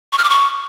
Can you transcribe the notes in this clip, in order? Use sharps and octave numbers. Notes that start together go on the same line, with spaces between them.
C#6
F6
D6
C#6